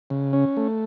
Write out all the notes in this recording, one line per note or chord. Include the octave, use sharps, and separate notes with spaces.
C#3
C#4
A3